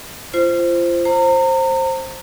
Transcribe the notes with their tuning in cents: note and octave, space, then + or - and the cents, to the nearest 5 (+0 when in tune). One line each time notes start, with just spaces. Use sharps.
F4 -30 C5 +0
C5 +15 A#5 -35